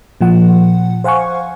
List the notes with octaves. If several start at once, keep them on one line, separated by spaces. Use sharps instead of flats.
A#2 F3 F#5
C5 F5 F#5 G#5 C#6